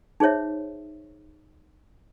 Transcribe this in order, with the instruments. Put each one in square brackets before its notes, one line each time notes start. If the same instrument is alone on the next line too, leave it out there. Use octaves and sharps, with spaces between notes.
[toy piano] D#4 G#4 C5 C#5 E5